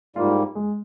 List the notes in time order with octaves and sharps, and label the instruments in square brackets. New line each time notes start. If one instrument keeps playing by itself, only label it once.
[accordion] G#2 G3 A#3 [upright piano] F4
[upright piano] G#3